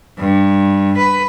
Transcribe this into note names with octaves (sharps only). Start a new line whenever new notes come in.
G2
B4